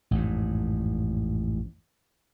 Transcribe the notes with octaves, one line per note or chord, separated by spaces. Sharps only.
A1 F2 G#2